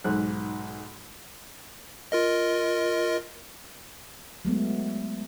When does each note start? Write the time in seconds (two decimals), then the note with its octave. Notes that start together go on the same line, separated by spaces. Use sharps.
0.04 B1 G#2 F#6
2.12 F4 A#4 D#5
4.45 F#3 G#3 A3 B3